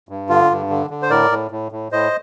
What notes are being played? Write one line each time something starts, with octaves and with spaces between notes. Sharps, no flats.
G2
D3 F4
G2
D3
D3
C5
A2 A#4 D5
A2
A2
A2
A2 C5 D#5